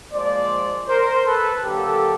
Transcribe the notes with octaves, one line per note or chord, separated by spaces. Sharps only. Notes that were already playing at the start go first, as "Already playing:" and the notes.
A#2 F3 G#3 C5 D5
A#4 C5
A4 B4
D3 F#3 A#3 G4 A4